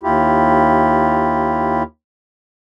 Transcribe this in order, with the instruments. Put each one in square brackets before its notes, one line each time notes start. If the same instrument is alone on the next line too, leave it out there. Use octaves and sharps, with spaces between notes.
[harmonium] D#2 E4 F4 G4